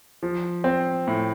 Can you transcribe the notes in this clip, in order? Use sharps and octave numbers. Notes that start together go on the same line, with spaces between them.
F3
C4
A2